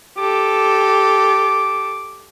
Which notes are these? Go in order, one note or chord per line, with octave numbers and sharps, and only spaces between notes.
G4 A4 D6